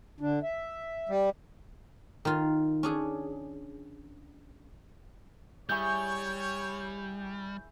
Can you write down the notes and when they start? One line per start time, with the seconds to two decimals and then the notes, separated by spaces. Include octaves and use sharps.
0.20 D3 D4
0.43 E5
1.09 G3
2.25 D#3 F4
2.83 C#4 D4 G#4
5.69 G3 E4 G#4 C#5 C#6 G6